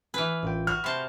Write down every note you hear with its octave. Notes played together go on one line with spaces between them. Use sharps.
E3 B4 G#5 F6
A1 F4 G5
F#4 F6
C3 A5 B5 C6 G6